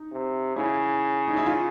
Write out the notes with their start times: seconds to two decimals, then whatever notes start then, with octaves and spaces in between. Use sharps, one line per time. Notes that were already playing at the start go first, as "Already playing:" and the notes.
Already playing: D#4
0.12 C3
0.56 C#3 E4
1.27 D#4
1.37 E4
1.46 F4